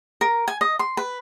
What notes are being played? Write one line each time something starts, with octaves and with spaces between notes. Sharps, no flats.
A#4
G#5
D#5
C6
B4